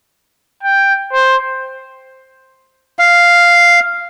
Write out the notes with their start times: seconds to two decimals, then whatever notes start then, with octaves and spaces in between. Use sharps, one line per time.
0.63 G5
1.13 C5
2.99 F5